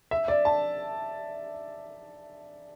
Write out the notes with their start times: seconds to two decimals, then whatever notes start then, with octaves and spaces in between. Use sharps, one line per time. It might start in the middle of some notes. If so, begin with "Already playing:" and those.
0.11 E5
0.28 D5
0.45 A5